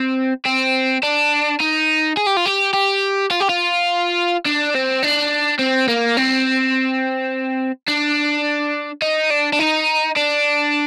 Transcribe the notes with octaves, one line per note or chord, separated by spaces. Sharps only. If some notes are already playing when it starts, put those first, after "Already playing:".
Already playing: C4
C4
D4
D#4
G#4
G4
F4
G4
G4
F4
G4
F4
D4
C4
D4
C4
A#3
C4
D4
D#4
D4
D4
D#4
D4